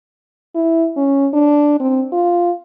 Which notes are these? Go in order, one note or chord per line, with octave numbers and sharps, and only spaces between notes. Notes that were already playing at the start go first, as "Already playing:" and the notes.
E4
C#4
D4
C4
F4